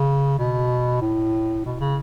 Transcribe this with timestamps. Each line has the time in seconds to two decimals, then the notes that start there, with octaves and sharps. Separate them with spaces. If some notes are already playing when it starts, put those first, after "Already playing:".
Already playing: C#3
0.38 B2
1.01 A2
1.65 B2
1.80 C#3